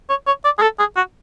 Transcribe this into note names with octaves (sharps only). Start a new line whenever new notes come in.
C#5
C#5
D5
G#4
A4
G#4
F#4